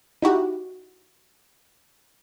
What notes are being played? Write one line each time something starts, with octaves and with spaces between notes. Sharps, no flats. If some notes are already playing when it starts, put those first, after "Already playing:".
D#4 E4 F#4 G4